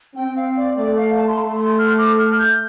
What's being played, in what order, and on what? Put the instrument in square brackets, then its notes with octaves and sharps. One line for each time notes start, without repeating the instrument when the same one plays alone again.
[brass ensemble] C4 [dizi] G5
[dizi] F5
D5
[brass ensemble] A3 [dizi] D5
[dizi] F5
A5
C6
[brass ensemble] A3 [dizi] A5
[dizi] C6
F6
D6
F6
G6